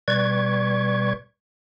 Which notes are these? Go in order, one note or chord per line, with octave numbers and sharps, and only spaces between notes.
B2 G3 B4 D5 C#6 G#6